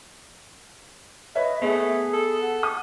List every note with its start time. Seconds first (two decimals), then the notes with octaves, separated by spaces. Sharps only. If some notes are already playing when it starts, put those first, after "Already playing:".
1.35 B4 C#5 D#5 E5
1.62 A3 B3 G#4
2.13 A4
2.41 F#5
2.63 D#6